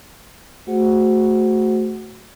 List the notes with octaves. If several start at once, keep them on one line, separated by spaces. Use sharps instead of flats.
A3 F#4 G#4 C5 F#5